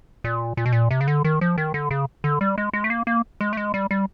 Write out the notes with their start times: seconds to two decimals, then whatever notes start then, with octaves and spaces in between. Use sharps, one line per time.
0.24 A#2
0.57 A#2
0.66 B2
0.72 A#2
0.91 C3
1.01 C#3
1.08 D3
1.24 D#3
1.41 F3
1.58 D#3
1.74 D3
1.91 C#3
2.24 D3
2.41 G3
2.58 G#3
2.73 G#3
2.84 A3
2.90 A#3
3.07 A#3
3.41 G#3
3.53 A3
3.57 G#3
3.74 G3
3.91 G3